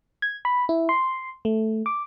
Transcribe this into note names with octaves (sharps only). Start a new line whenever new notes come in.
G#6
B5
E4
C6
A3
D6